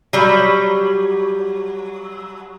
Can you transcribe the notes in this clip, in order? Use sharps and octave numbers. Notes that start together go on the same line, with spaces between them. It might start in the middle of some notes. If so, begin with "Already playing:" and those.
F#3 G3